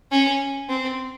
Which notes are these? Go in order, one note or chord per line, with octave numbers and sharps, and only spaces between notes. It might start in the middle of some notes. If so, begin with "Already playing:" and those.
C#4
C4